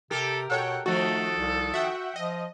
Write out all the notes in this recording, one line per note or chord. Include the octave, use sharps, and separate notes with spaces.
C3 G4 A4 A#4
B2 A4 C#5 F#5 G5
D#3 F3 A3 F#4 A4
C2
F#4 E5 F#5 G5
F3 D#5